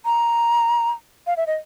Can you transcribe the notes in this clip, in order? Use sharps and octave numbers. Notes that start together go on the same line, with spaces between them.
A#5
F5
E5
D#5